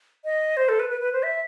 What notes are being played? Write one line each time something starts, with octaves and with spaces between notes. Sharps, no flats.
D#5
C5
A4
B4
B4
B4
C5
E5